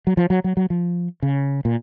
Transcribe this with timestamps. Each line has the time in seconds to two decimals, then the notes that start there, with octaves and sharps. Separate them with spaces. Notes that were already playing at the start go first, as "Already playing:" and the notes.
0.07 F#3
0.17 F3
0.30 F#3
0.44 F#3
0.57 F#3
0.70 F3
1.22 C#3
1.65 A#2